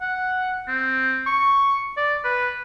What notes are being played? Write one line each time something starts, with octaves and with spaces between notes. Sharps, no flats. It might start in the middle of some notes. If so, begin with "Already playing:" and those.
F#5
C4
C#6
D5
B4